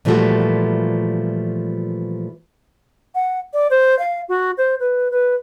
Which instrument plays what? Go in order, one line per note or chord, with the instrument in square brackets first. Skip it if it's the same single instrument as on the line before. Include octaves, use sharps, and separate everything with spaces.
[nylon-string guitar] A#2 E3 F3 G3 A3 F#4
[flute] F#5
D5
C5
F5
F#4
C5
B4
B4